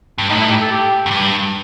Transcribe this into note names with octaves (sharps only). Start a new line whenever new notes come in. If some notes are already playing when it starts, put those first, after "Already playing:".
G2
A2 D#4
E4
G4
A4
G4
F#2
G2